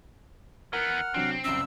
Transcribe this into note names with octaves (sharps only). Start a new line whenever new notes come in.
E3 B3 A#4 F#5 F6
C3 F#3 C4 D4
F#1 C2 C#3 E6